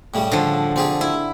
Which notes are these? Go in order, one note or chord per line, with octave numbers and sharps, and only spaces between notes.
A2 C#3 G3
D3 F3
C4 G4 G#4
E4